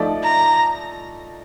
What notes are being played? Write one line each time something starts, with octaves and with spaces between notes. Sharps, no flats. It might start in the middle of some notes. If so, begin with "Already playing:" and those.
Already playing: F3 A3 D#4 A4 D5
A#5